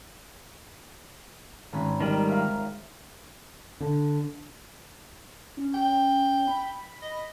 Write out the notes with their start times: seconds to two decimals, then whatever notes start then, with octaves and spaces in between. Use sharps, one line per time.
1.73 G#1 C#4 B5
2.00 D#3 G3 A#4
2.27 A#4 E5 F5
3.81 D3
5.57 C#4
5.74 G5
6.47 B5
7.02 D#5